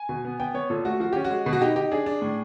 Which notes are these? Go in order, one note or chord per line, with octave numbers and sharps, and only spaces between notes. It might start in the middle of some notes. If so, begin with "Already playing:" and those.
Already playing: G#5
B2
B3
B3 G5
B3 C#5
A#2 A4
A3 F#4
F3 F#4
C#4 G4
F#4
G#3
B2
F#4
D#4 G4
D#4 G4
D4 G#4
D4
A2